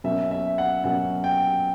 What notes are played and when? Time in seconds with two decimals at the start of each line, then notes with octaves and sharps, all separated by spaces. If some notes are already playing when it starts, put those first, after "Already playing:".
0.04 B2 F#3 A#3 C#4 E5
0.31 E5
0.58 F#5
0.84 B2 F#3 A#3 C#4 F#5
1.24 G5